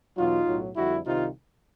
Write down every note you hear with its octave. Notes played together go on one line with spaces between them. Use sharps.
E2 B2 F#3 D#4 F4
B1 A2 F#3
F2 D3 G3 E4 F#4
C2 C3 D#3 D#4 F4